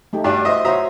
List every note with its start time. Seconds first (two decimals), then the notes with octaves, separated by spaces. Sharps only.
0.13 A3 D#4 G4
0.24 G2 D4 F#4
0.45 E4 C5 D#5 E5 D#6
0.65 F#4 C5 C#5 E5 A#5 D#6